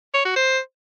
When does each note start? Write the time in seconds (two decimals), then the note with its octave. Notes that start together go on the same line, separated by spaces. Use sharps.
0.14 C#5
0.25 F#4
0.36 C5